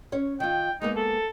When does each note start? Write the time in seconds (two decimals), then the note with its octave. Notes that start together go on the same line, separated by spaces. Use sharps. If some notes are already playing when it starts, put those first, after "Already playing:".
0.12 C#4 C#5
0.40 D#3 F4 G5
0.82 G#3 A#3 B3 D#4
0.96 A4